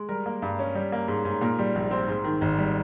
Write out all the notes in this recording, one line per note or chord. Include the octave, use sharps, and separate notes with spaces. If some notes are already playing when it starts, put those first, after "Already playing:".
Already playing: G#3
G3 A#4
A#3
G2
C#4
G3
A#3
G#2
G#2
A#2 A#4
G3
A#1
C4
G#2
D#3
G#1
G3